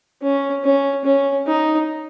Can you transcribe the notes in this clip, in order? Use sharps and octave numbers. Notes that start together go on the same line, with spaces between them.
C#4
C#4
C#4
D#4